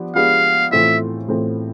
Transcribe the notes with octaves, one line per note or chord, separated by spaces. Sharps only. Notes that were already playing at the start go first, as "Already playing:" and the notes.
Already playing: F3 B3 D4 G4
F3 G#3 B3 D4 G4 F5
A2 E3 A3 C4 F4 E5
A2 E3 A3 C4 F4